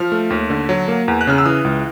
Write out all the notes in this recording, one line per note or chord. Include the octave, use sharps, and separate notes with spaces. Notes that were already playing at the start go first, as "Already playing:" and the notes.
Already playing: F3 F6
A3
D#2
D3
F#3
A#3
E2
F#6
C#3 F6
E6
E3 D#6
C#2